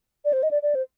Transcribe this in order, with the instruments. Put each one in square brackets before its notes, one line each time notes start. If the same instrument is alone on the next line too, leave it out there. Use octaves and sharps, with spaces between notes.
[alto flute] D5
C5
D#5
D5
D5
C5